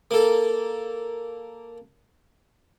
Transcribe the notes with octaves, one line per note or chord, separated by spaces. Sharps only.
A#3 A4